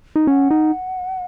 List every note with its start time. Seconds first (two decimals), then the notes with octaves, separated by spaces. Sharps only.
0.16 D#4
0.27 C#4 F#5
0.51 D#4